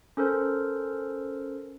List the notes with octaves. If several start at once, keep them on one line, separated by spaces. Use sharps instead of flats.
C#4 A4 A#4 C5